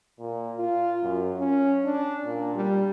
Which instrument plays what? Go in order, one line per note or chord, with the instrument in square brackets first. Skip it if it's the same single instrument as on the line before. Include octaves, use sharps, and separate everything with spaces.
[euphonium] A#2
F4
F#2
C#4
D4
A#2
G3